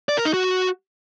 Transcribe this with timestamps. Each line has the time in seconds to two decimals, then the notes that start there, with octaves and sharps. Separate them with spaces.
0.09 D5
0.17 A#4
0.25 D#4
0.34 F#4